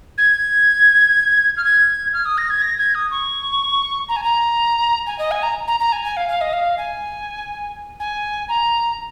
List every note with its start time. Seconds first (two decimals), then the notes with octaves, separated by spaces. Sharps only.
0.17 G#6
1.57 F6
1.64 G#6
2.13 F6
2.25 D#6
2.37 A#6
2.50 G#6
2.62 A#6
2.78 G#6
2.94 D#6
3.11 C#6
4.08 A#5
4.16 G#5
4.23 A#5
5.06 G#5
5.18 D#5
5.31 G#5
5.42 A#5
5.67 A#5
5.79 A#5
5.92 G#5
6.04 G#5
6.16 F5
6.28 F5
6.41 D#5
6.53 F5
6.77 G#5
7.99 G#5
8.48 A#5